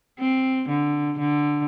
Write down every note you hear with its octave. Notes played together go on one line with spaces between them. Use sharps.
C4
D3
D3